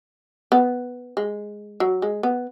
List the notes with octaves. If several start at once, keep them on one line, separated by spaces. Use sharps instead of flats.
B3
G#3
F#3
G#3
B3